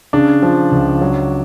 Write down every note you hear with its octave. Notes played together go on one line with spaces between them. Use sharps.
C#3 D4
F3
C#2
F#3